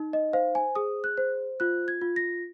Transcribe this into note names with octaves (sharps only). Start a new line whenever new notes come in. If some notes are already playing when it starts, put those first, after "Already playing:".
Already playing: D#4
D#5
C5 F5
G#5
G#4 D#6
F#6
C5
F4 F#6
G#6
F4
A#6